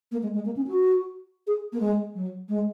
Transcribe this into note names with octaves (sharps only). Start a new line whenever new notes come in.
A#3
G#3
G#3
A#3
C#4
F#4
G#4
A#3
G#3
F#3
G#3